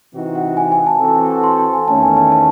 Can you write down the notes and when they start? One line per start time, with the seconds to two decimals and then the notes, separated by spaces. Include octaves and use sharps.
0.13 C3 E3 C4 D#4 F#4
0.36 F#5
0.57 G#5
0.72 G#5
0.87 A5
1.01 E3 C4 F#4 A4
1.44 C6
1.59 A5
1.73 G#5
1.88 E2 D#3 A3 C#4 A5
2.02 G#5
2.17 A5
2.32 A5